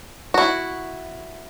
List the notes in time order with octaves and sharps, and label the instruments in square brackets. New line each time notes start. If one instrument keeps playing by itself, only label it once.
[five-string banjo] E4 F#4